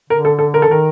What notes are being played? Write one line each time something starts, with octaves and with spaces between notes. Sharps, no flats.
D3 A#4
A4
A4
A#4
A4
D#3 A#4